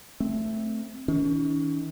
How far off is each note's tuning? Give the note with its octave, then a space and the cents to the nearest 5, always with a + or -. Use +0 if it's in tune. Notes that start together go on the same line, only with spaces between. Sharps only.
A3 +0 C4 +0
D#3 +40 C#4 +40